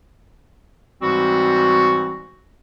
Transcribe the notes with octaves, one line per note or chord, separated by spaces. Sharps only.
G#2 E3 G3 G#3 C4 F#4